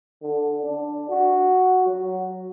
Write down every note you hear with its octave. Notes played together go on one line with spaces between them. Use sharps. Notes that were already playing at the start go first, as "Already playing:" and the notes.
D3
D4
F#4
F#3